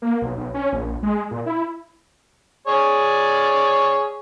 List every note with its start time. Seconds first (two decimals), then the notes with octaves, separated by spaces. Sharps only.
0.02 A#3
0.22 B1
0.37 B1
0.54 C#4
0.72 A#1
1.03 G#3
1.31 A#2
1.46 E4
2.67 G#4 C#5 D5